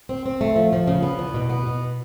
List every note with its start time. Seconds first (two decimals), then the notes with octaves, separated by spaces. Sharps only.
0.09 C4
0.26 C4
0.41 A3
0.56 F3
0.73 F3
0.87 C#3
1.03 B3
1.19 E2
1.34 B2
1.50 B3
1.66 B2